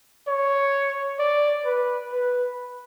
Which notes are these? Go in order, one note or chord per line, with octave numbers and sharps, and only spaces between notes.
C#5
D5
B4
B4